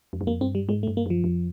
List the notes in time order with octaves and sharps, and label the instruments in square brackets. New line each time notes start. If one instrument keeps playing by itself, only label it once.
[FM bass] F2
F#2
[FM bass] F2 [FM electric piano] A#3
[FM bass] G2 [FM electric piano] C4
[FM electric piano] G3
[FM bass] G#2 [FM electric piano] G#3
[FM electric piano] A3
[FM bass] G2
[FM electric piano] A#3
[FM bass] F#2 [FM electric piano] F3
[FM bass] F2